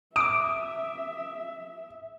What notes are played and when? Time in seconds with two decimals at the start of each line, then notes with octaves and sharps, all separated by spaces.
0.16 E5 D6 D#6 D7